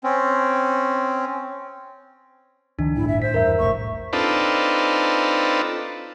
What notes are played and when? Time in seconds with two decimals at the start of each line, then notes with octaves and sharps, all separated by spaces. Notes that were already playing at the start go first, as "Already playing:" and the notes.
0.04 C4 C#4
2.79 C#2 D#3 F3 D4
2.96 G1 A2 E4
3.08 E5
3.22 C5 B6
3.34 E2 G2 A#4 E5
3.59 F1 B1 A2 C#6
4.13 C4 D4 D#4 F4 A4 B4